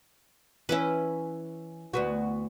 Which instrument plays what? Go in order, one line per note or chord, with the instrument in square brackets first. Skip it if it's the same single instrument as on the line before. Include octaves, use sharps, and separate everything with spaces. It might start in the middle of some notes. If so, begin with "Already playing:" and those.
[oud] E3 E5 [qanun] C#4 E4 B4
[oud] D2 B3 F#4